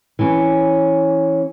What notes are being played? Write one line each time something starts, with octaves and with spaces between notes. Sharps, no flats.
E3 C#4